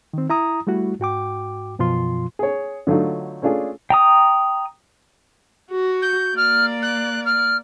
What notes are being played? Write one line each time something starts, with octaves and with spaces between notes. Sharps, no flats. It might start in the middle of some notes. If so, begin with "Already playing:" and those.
D#3 C4
E4 A#5 D#6
G3 A3 E4 F#4
G#2 F#4 G5 D6
F#2 B2 F3 F4 C6
G#4 C#5
D3 F#3 A3 D#4 F4
A3 C#4 D4 F4 G#4
G5 A#5 D#6
F#4
G6
A#3 D5 F6
F#6
F6